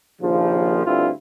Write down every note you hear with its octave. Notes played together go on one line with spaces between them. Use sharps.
A#1 D#2 C#3 F3
D2 G2 C4 E4 F4